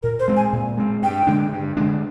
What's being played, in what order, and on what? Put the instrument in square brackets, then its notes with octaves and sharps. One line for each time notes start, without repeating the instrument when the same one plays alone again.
[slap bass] A#2 [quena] A#4
[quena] C5
[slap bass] G#3 C4
[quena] G#5
[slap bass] A#2
G#3 C4
[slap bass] G2 [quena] G5
[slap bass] D3 G#3 D4
G2
D3 G#3 D4